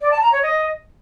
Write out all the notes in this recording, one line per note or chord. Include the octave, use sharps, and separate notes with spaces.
D5
A5
A#5
C#5
D#5